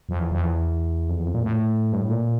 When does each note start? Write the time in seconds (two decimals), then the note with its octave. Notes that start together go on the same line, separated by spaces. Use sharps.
0.09 F2
0.20 E2
0.31 F2
0.43 E2
1.09 F2
1.18 E2
1.26 F2
1.34 A#2
1.43 A2
1.93 G2
2.02 A2
2.10 A#2